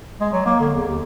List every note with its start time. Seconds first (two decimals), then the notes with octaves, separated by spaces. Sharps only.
0.20 G#3
0.32 F#3
0.46 A#3
0.59 D3
0.74 E2
0.86 D#2